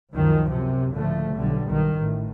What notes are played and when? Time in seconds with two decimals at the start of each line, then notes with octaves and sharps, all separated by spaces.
0.13 C#2 F#2 D#3 F3
0.49 F#2 C3
0.95 C#2 A2 D3 F3 A3
1.34 B1 D3 G3
1.68 B1 G2 D#3
1.98 A1 A2